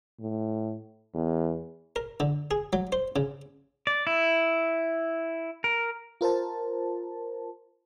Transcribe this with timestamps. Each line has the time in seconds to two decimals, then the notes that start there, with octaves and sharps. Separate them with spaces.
0.20 A2
1.14 E2
1.96 A#4
2.20 D3
2.51 G#4
2.73 F#3
2.92 C5
3.16 C#3
3.87 D5
4.07 E4
5.64 A#4
6.21 F4 A#4 C5 A5